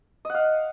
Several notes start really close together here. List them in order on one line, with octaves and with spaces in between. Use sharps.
D#5 F#5 F5